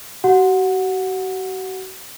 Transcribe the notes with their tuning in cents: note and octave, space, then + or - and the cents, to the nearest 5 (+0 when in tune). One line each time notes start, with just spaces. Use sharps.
F#4 +40 F#5 -15